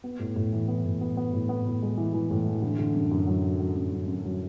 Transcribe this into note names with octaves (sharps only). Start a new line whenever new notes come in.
B3
A2
A2
E3
B3
A2
B3
B3
A2
B3
A2
G#3
E3
E3
A2
E3
D3
D3
F#2
F#2
F#3
F#3
F#3
F#2
F#2
F#2
F#3